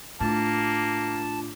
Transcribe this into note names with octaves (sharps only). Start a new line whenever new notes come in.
A2 A#3 D4 F4 A5 D6